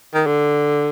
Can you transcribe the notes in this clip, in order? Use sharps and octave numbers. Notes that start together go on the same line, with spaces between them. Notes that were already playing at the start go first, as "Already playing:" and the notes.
D#3
D3